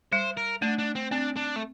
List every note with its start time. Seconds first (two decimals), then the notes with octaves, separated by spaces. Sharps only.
0.12 G3 C5
0.37 A#4
0.62 A3 D4
0.79 D4
0.95 C4
1.11 C4 D4
1.36 D4
1.56 A3